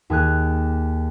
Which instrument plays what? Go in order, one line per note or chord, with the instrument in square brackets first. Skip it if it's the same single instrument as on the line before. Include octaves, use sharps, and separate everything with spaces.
[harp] D#2 G#4 F#6